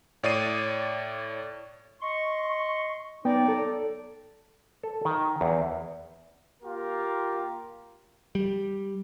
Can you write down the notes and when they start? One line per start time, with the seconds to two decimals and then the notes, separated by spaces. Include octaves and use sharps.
0.23 A2 C#5 D5 D#6 C7 D#7
2.01 D#5 C6 C#6
3.25 F#3 B3 D#4 D5 G5
3.48 A4
4.83 A4
5.05 D#3
5.41 E2
6.62 A#3 F4 G4 A#4
8.35 G3